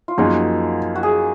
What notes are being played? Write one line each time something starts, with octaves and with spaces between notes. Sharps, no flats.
F4
F#2 F3 A#3 D#4 F#4 G#4
F#4
G#4